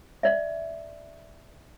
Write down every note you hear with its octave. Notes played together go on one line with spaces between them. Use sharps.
D5 E5